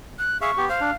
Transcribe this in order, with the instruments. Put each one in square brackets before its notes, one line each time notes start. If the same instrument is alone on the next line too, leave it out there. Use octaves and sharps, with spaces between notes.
[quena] F#6
[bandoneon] G#4 E5 F5 [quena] C#6
[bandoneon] B3 G4
[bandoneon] C5 [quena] F5
[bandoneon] D4